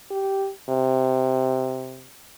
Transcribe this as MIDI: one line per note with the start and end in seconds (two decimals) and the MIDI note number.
0.11 0.51 67
0.69 2.11 48